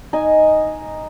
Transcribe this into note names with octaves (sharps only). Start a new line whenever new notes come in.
D#4 G#5